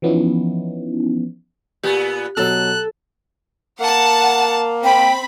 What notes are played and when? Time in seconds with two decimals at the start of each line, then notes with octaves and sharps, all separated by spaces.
0.02 E3 F3 B3 C#4 D#4 E4
1.84 A#2 B3 G4
2.37 B2 F#3 A4 F#6
3.80 A#3 F#5 A5
4.84 C4 G5 B5